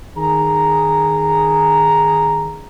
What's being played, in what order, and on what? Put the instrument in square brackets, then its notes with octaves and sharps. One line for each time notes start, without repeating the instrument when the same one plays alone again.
[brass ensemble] D#3 G#4 A#5